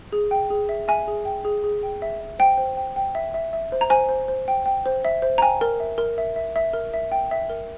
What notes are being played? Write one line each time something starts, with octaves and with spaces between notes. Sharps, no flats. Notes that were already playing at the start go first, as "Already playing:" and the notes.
G#4
G5
G#4
E5
E5 G#5
G#4
G5
G#4
G#4
G5
E5
E5
C5 G5
C5
G5
G5
E5
E5
E5
C5
A#5
C5 G#5
C5
C5
G5
G5
C5
E5
C5
A#5
G5 G#5
A#4
E5
A#4
E5
E5
E5
A#4
E5
G5
E5
A#4